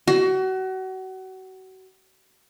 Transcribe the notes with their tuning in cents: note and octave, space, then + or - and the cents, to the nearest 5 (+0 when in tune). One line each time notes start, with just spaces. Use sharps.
F#4 +30